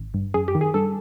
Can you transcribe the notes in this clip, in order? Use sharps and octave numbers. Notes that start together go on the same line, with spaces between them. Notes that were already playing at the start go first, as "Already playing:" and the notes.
Already playing: G#1
G2
F#2 G#4
G4
D#3
G#4
G2 A4